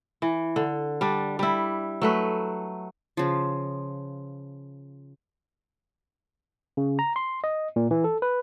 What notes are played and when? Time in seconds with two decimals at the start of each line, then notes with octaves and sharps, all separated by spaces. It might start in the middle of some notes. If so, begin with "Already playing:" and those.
0.22 E3
0.56 D3
1.01 G3 D4
1.39 G3 E4
2.02 F#3 A3 B4
3.17 C#3 F3
6.77 C#3
6.99 A#5
7.16 C6
7.44 D#5
7.76 A#2
7.91 E3
8.04 A4
8.22 B4